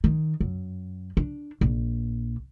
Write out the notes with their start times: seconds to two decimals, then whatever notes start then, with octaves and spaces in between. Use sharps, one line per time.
0.04 D#3
0.41 F#2
1.17 D4
1.61 A#1